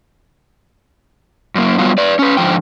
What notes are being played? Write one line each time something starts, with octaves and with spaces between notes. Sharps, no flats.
F#2 A#3
F#3 G3 B3 F4
B4 D5
C#4 B4
G#2 D3 F3 G5